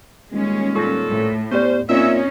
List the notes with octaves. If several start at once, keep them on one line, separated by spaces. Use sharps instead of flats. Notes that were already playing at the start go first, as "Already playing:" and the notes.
D#1 G#3 C#4
A#2 A4 C#6 A#6
A2
B3 C#4 G4 C5 D5
A#2 C4 C#4 D#4 C#5 E5